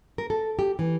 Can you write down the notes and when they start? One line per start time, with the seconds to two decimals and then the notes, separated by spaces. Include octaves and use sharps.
0.18 A#4
0.30 A4
0.59 G4
0.79 E3